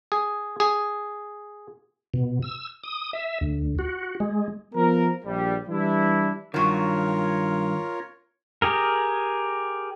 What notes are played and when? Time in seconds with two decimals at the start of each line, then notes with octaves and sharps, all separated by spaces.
0.12 G#4
0.60 G#4
2.14 B2
2.42 E6
2.84 D#6
3.13 E5
3.41 D2
3.79 F#4
4.20 G#3
4.73 F3 B3 A#4
5.23 A#1 G3
5.67 E3 G3 D4 E4
6.54 G2 D#3 F#3 F4 F#4 A#4 C#5
8.62 G4 G#4 A#4